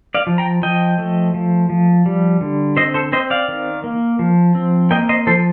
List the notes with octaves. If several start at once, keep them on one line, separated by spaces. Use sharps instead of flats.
D5 F5
F3
G5 A#5
F3 D#5 G5
A3
F3
F3
G3
D3
C4 C5 D#5
A4 C5
C4 C5 D#5
D5 F5
D#3
A#3
F3
C4
A#3 D#5 G5
C5 D#5
F3 A4 C5